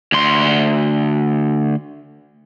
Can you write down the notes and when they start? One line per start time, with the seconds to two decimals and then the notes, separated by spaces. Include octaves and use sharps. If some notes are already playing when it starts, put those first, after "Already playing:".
0.12 D2 C6